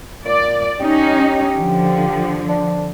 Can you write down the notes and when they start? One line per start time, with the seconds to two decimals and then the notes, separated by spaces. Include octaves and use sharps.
0.25 A#2 D5
0.80 C#4 D#4 G4
1.57 D3 F3
2.49 D4